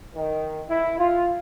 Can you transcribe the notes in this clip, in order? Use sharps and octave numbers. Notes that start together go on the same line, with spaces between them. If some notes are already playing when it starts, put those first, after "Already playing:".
D#3
E4
F4